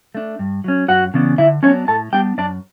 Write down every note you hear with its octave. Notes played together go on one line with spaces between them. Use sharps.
A3 D4
G2
F#3 C#4
F#2 F#4 F#5
C#3 E3 B3 D4
D3 E4 E5
F#3 B3 C#4 D4 C#5
A2 A4 A5
G3 B3 D4 G4 G5
F#2 D4 D5